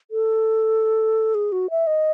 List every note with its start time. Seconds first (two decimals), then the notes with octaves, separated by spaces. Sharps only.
0.11 A4
1.35 G#4
1.52 F#4
1.70 E5
1.87 D#5